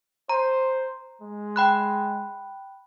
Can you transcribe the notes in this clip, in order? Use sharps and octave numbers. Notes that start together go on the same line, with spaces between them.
C5 A#5
G#3
G5 B5 F#6